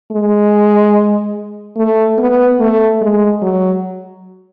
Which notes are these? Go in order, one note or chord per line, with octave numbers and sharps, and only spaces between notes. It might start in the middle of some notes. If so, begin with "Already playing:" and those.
G#3
A3
B3
A3
G#3
F#3